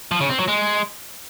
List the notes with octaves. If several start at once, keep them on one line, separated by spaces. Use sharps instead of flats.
F3
C#3
C4
F#3
G#3